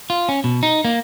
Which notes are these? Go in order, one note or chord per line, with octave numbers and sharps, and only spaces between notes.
F4
C#4
B2
D#4
A#3